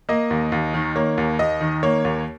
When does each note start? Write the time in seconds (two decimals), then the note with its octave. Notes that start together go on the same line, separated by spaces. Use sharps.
0.09 A#3 D#5
0.31 D#2
0.52 D#2
0.74 D#3
0.96 A#3 C#5
1.18 D#2
1.39 D#2 D#5
1.61 D#3
1.83 A#3 C#5
2.05 D#2